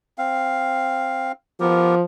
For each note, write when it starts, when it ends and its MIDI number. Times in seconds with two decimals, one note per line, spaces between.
0.18 1.32 60
0.18 1.32 77
1.60 2.04 53
1.60 1.95 59
1.60 1.95 67
1.60 1.95 70